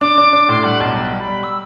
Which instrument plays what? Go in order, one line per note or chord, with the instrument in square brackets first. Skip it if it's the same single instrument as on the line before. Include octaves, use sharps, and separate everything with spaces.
[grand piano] D4 [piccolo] D6
[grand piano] D4
D4
[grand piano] A2 [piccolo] C6
[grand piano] G3 [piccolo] F#5
[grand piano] B1 [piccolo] A5
[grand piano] B1 [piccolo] G5
[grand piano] G3
[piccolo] B5
[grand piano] G3
[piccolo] E6